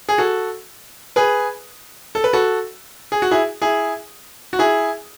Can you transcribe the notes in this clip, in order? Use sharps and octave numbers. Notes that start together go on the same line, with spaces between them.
G#4
F#4 A4
G#4 B4
A4
B4
F#4 A4
G#4
F#4
E4 G#4
E4 G#4
F#4
E4 G#4